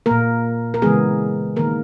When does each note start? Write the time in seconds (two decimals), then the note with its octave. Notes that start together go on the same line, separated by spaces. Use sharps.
0.06 A#2 A#3 A#4
0.74 A#4
0.82 C#3 E3 G#3 B3 G#4
1.56 D#3 A#3 A#4